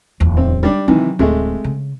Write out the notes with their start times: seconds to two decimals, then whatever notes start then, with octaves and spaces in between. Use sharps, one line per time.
0.20 D1 E2
0.37 C4
0.63 G3 D4
0.88 C3 D#3 E3 F#3
1.19 D1 C3 G#3 A3
1.64 C#3